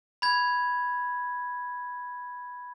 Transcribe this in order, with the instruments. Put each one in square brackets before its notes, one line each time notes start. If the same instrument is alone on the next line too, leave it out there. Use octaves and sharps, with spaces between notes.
[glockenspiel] B5 G#6